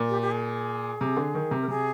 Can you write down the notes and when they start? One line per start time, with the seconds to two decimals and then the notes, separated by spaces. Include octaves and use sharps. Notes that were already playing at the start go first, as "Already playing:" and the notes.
Already playing: A#2
0.09 G4
0.22 G4
0.31 G#4
1.01 C3
1.17 D3
1.35 D#3
1.51 C3
1.62 A#4
1.68 C3 G#4